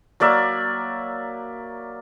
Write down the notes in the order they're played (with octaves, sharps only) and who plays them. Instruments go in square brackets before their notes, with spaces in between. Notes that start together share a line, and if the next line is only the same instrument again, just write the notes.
[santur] F#3 A#3 D5 E5